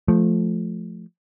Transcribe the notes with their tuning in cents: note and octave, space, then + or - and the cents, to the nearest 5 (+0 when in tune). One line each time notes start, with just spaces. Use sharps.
F3 +0 A3 -10